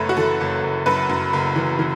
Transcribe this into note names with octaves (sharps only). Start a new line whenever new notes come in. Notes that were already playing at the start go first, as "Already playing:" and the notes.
Already playing: F#1 F#2 A3 B4 C#5
F#4
E3 A4
F#1
F#1
F#2 B4
F#2
F#1
E3
E3